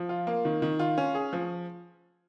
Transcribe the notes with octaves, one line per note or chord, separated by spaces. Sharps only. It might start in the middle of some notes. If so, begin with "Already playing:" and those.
Already playing: F3
F4
A#3
D#3
D#3
F4
C#4
G#4
F3